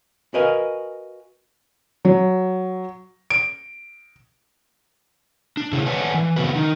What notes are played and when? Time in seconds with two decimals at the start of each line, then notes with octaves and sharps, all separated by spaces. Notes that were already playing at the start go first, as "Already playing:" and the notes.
0.34 F#4 A#4 B4 D#5 F5 G#5
2.05 F#3
3.30 D7
5.57 D4
5.73 C#3 E4 G#4
5.86 B4 C#5 D5 F#5 G#5 A5
6.14 E3
6.36 C#3 B3 F#4 B4
6.56 D#3 D#4